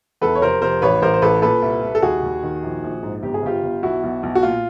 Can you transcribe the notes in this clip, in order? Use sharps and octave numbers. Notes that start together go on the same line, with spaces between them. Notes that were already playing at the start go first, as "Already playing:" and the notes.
E2 A4 B4
C#5
F1 A#4 C5
F1 A#4 C5
A1 B4 C#5
A1 A#4 C5
C5
A1 A4 B4
A#2 A4 B4
C2
C2
A4
D#2 F#4 G#4
D#2
D#3
A#1
A#1
G#2
G1 G4
G#4
G1 F4 G4
G1
B1 E4 F#4
B1
B1
F#4
A#2 F4